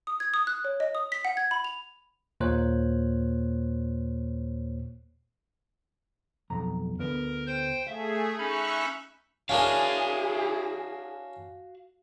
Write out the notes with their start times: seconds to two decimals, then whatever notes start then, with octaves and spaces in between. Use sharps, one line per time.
0.07 D#6
0.20 G#6
0.34 D#6
0.47 F#6
0.65 C#5
0.80 D#5
0.95 D#6
1.12 B6
1.25 F#5
1.37 G#6
1.51 B5
1.64 F7
2.40 D#2 A#2 A#3 C5 C#5 F#6
6.50 B1 F2 A#5
6.99 D2 B3 A#4
7.47 C5 G5 G6
7.87 A3 G#4 E5 F5
8.38 C#4 D#4 E5 B5 C#6 F#6
9.49 C#4 D4 E4 F#4 G#4 A#4 F5